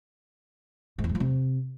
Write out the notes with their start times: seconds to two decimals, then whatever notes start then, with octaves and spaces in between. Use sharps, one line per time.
0.98 G#2
1.04 E2
1.09 G#2
1.15 F3
1.20 C3